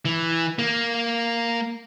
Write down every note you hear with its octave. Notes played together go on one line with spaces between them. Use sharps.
E3
A#3